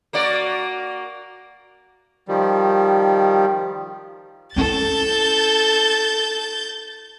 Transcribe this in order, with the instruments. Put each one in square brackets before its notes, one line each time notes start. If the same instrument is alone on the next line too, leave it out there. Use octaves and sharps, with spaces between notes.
[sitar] A#3 F#4 D5
[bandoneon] D#3 F3 G3
[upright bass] C#4 E4 [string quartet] A4 [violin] G6 A6